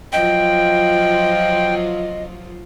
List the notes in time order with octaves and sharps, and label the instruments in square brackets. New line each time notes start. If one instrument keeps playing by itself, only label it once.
[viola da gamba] F3 F#3 F4 [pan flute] D#5 [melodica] G5